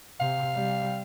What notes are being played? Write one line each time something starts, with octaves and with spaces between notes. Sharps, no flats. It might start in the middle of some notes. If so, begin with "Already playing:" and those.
C3 F5
C3 G3